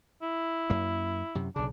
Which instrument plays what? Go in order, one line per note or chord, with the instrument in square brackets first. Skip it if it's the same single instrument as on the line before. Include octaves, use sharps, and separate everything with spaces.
[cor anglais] E4
[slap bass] F#2 A#3
F#2 C3
[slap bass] B1 C#3 [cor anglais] D4